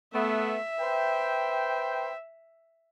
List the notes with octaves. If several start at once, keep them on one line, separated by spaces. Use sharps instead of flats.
A3 B3 E5
B4 C5 G5